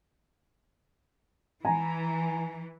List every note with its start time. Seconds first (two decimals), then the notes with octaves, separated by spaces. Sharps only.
1.65 E3 G#5 A#5